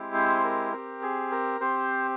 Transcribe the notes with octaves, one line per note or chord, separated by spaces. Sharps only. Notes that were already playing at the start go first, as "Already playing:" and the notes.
Already playing: G#3 C4 E4 G4
C5
A#4
C4 G4 A#4
G#4
A#4
C4 G4 C5